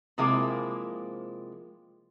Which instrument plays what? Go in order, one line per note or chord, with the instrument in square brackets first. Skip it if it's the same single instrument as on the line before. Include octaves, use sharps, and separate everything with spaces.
[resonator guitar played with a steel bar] C3 F3 G#3 A#3 E4